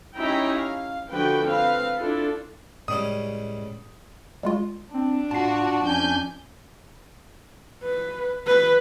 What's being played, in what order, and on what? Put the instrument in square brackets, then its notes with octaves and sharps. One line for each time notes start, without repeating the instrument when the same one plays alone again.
[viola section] C#4 D#4 E4 G4 G5 A#5
F5
D3 F3 F#4 B4 G5
C4 B4 F5
D4 E4 F4 A4
[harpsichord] C#2 G3 C#4 [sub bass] A2 [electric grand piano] D#6
[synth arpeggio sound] G3 G#3 F4
[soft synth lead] C4 [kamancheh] D4
[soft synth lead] A2 [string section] F4 F#4 F#5 [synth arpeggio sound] A5 C7
[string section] F2 G#5 G6 [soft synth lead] C#4
[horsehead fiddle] B4
B4